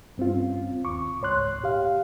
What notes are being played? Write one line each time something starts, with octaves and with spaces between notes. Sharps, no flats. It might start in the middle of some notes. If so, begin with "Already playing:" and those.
G2 C4 C#4 F4
D#2 C#6 D6
C#2 G#2 C#5 C6 F#6
A#2 G4 F5